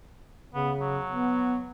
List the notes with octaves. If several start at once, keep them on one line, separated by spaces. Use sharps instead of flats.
C#3 B3
F#3
B3